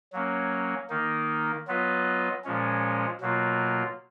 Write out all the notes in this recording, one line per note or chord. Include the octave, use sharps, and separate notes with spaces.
F#3 A#3 C#4
D#3 A#3 D#4
F#3 B3 F4 B4 D#5
A#2 F3 G#3 C#4
B2 F#3 A#3 F4